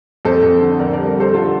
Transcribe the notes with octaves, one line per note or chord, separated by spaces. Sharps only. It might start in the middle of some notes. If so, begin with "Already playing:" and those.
F2 A4 C5
F2
D3
F2 A#4 D5
A#4 D5
G3
G3 A4 C5
D3 F4 A4